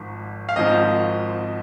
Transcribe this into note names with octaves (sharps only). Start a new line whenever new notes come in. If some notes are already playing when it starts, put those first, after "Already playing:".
Already playing: G#1 G#2 F3
F5
G#1 G#2 F3 C4 D#5